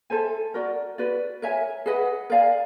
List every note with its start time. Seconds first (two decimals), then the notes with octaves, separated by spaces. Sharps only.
0.10 A4 C5 E5 G#5
0.54 F#4 A#4 D5
0.98 F#4 B4 D5
1.42 A#4 C#5 E5 G#5
1.86 G#4 B4 D#5 F#5
2.30 A#4 D5 F5 G#5